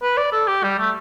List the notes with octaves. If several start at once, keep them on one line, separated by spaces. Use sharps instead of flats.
B4
D5
A4
G4
G3
A3